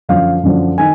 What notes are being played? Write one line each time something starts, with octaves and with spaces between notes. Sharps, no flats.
F#2 D3 F3 F5
F#2 D3 F3
D#3 G#5